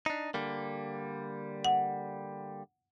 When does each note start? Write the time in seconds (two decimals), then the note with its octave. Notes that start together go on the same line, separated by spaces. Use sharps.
0.06 D4 D#4
0.34 D3 G3 A#3
1.65 F#5